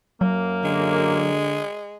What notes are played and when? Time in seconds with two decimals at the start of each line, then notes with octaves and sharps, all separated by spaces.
0.21 F#2 F#3 A#3
0.64 D3 G#3